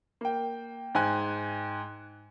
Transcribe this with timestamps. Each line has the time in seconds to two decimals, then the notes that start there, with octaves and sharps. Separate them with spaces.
0.21 A#3 G5
0.95 G#2 G5 G#5 F#6